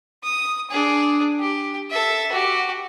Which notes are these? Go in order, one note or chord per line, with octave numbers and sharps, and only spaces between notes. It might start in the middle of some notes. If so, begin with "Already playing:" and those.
D#6
D4 G#4
G4
A4 E5
F#4 G4